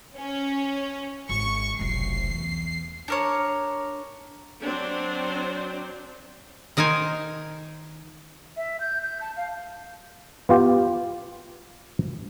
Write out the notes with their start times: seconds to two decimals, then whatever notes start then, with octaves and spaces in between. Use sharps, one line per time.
0.16 C#4
1.29 G#1 C#6
1.79 F1 B1 C7
2.30 E2
3.08 D4 A#4 C#5
4.63 F#3 C4 D4 C5
6.77 D#3 D#4 A#4 C5 G#5
8.57 E5
8.80 G6
9.03 G6
9.21 A5
9.37 F5
10.49 B3 F4 G4